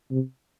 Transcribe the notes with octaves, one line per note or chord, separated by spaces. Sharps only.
C3